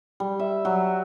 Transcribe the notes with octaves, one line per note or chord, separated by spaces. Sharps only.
G3
E5
F#3